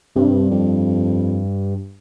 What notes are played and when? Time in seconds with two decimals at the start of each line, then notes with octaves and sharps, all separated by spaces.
0.16 G2 C3
0.51 F2